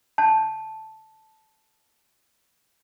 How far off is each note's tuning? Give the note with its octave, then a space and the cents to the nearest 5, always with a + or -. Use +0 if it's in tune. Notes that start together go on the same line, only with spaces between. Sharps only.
A5 -5